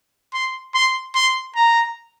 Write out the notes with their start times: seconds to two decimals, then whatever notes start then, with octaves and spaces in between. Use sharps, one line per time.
0.34 C6
0.74 C6
1.15 C6
1.56 A#5